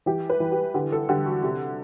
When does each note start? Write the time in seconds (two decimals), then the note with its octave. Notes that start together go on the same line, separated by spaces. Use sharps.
0.06 E3 G4
0.30 B4
0.40 E3
0.52 G4
0.74 D3 G4
0.92 A4
1.09 D3 G4
1.26 F#4
1.43 C3